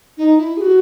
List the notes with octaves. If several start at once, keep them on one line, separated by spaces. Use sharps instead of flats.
D#4
E4
G#4
F#4